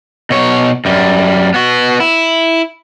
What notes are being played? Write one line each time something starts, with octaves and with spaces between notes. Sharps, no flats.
B2 C#5
F#2 G3
B3 F#4
E4